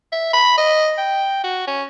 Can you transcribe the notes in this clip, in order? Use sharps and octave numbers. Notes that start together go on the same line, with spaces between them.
E5
B5
D#5
G5
F#4
C#4